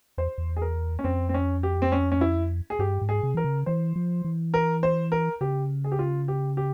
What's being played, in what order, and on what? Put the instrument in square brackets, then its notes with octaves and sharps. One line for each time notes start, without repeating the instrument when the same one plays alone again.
[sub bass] E2 [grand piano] C5
[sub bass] E2
[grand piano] G#4
A#4
C#4
[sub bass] F2 [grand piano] C4
[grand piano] C4
C#4
G4
C4
C#4
C#4
E4
G#4
[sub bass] G2 [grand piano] G4
[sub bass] G#2
[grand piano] G#4
[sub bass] C3
[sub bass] E3 [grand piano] A#4
[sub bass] C#3
[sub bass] E3 [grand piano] C5
[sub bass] F3
E3
[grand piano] A#4
C5
A#4
[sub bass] C#3 [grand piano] G4
[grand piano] G#4
G4
F4
G4
G4